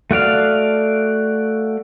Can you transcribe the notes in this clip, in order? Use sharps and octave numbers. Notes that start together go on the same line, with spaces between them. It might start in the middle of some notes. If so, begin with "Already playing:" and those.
A3 F#4 D5 F5